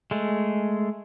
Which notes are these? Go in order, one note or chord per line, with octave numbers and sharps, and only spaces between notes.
G#3 A3